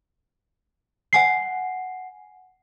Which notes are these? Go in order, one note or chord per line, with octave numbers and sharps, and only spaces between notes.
F#5 G#5 C7